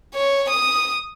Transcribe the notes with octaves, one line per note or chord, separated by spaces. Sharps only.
C#5
D#6